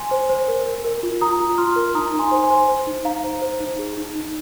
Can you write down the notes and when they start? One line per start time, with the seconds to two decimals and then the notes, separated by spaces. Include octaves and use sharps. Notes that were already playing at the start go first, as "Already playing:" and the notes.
Already playing: G#5 C6
0.11 C5
0.29 C5
0.48 A#4
0.66 A#4
0.84 A#4
1.03 F4
1.21 F4 A#5 D#6
1.40 F4
1.58 F4 C6 F6
1.76 A#4
1.95 D#4 A#5 D#6
2.14 D#4
2.19 G#5 C6
2.31 C5
2.44 G#5 C6
2.51 C5
2.68 C5
2.87 D#4
3.05 D#4 F5 A#5
3.24 C5
3.42 C5
3.60 D#4
3.79 G#4
3.97 D#4
4.16 D#4